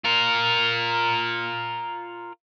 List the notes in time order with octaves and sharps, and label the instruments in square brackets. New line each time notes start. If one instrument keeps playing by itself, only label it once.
[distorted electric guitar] F4 A#4